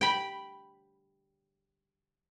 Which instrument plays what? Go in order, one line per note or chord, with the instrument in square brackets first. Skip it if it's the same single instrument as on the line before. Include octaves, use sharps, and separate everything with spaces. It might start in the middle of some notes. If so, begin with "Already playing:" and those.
[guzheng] G5 B5